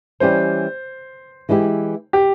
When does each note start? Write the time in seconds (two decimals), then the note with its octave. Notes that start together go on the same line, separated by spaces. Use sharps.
0.20 E3 G3 C#4 G4 C5
1.49 E3 G#3 E4 G4
2.13 G4